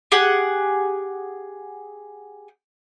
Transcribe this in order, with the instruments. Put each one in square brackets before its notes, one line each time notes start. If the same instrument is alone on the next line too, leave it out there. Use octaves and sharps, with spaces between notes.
[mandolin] G4 G#4 F#5